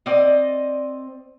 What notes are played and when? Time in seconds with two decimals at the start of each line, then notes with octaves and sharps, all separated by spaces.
0.06 C4 D5 D#5